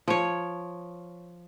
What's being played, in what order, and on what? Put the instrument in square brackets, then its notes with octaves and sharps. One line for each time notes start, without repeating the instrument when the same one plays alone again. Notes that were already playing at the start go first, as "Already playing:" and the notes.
[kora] F3 C#5